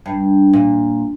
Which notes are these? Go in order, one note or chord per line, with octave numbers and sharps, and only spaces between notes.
G2
A#2